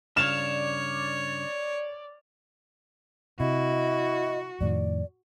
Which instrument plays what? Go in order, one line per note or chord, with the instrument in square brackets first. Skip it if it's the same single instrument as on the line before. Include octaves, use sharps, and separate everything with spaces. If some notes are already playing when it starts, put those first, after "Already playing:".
[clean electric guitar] G2 C#3 F5 [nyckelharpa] C#5 [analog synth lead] D5 [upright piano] F6 E7
[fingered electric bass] C3 [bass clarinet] E4 [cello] F#4 [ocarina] D#5
[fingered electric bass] F2 A2 D#3 [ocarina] D5